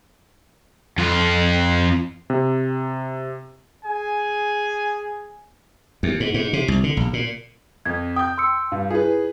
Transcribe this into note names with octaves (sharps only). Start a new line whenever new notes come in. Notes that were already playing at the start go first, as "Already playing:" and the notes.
F2 F4
C3
G#4 G#5
D#2
G#2
G#2
C3
C2
D3
A#1
A#2
F2 G#6
G5 D#6 G6
C6 E6 C#7
G2 F5
E4 F4 G#4 B4